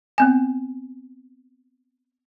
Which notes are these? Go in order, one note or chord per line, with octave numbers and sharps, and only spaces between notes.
B3 C4 G#5